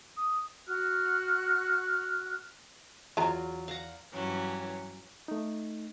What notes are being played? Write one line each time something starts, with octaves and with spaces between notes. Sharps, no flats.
D#6
F#4 F6 F#6
E2 F#3 G#3 B3 F4 A#5
F5 F#5 A#5
G2 E3 F#3 C#4
A3 D#4